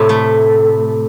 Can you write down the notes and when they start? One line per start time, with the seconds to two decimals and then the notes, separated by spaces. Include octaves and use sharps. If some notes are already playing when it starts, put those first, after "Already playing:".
Already playing: A2 C3
0.09 A3